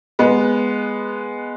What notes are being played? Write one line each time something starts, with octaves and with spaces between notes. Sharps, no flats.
G#3 B3